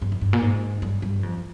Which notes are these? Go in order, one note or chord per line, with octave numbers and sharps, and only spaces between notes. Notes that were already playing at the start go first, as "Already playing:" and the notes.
G2
F2
G2
A#2
G#2
G2
G2
F2